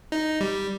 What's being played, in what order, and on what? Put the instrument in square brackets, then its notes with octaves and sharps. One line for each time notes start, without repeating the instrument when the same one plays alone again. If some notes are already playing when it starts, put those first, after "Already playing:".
[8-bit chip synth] D#4
G3